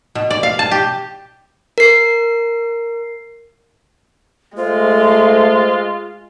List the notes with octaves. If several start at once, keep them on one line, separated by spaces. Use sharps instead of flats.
B2
D5
F5
A5
G4
A#4 C7
G#3 A3 F4 C5